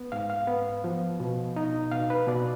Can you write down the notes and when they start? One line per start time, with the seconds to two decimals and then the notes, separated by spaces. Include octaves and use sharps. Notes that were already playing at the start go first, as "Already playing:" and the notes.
Already playing: B3
0.12 G#2 F5
0.30 F5
0.47 B3
0.84 F3
1.20 B2
1.56 D#4
1.92 B2 F5
2.10 B4
2.27 B2 D5